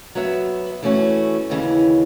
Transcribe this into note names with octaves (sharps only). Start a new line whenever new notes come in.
F#3 B3 F#4 B4 E5
E3 A3 C#4 F#4
D#2 C#3 E3